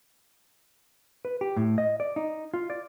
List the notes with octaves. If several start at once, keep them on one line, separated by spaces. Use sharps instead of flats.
B4
G4
A2
D#5
D5
D#4
F4
D5